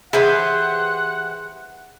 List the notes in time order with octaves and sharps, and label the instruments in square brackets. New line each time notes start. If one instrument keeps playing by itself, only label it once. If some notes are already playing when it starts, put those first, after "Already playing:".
[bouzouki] E3 G4 [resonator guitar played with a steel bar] G#4 [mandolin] B4 C5 [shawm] F#5